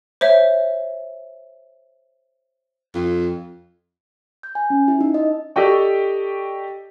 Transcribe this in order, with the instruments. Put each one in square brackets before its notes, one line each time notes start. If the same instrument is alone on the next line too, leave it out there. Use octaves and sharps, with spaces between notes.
[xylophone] C5 C#5 E5
[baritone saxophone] F2
[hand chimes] G6
G#5
C#4
E4
D#4
D#5
[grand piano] G4 A4 D5 D#5 G5 C#6